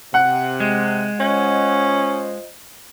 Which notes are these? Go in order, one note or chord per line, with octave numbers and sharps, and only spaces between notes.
C3 F#5
G#3
C#4 F4 C5 D#5